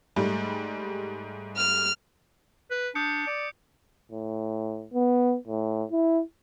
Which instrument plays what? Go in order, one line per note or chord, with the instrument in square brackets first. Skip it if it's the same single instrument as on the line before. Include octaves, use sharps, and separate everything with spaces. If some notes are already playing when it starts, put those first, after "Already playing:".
[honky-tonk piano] G#2 G3 A3
[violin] F6
[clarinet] B4
[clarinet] D4 [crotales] D#6 G6 C#7
[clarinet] D5
[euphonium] A2
B3
A2
E4